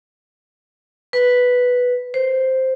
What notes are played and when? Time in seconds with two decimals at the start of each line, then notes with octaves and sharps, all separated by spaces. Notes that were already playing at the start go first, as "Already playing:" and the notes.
1.13 B4
2.14 C5